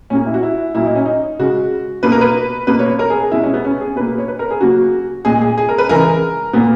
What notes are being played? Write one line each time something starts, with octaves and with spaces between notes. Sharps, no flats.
A#2 A#3 C#4
E4
F#4
E4
A#2 F#3 A#3 E4
D#4
C#4
D#4
C#3 G#3 F#4
B2 A#3 B4
A#4
B4
B2 A#3 B4
C#5
C#5
A#4
G#4
G#4
B2 G#3 E4
C#4
B3
C#4
G#4
B2 A#3 B4
C#5
B4
A#4
G#4
C#3 F#3 A#3 F#4
A#2 G#3 G#4
G#4
G#4
A#4
B4
C#3 E3 G#3 A#4
A#2 A#3 B3